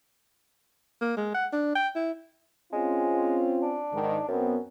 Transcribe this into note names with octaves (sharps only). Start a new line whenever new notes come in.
A#3
G#3
F#5
D4
G5
E4
G#3 C4 C#4 F4
D4
G#2 D#3
F#2 B3 C4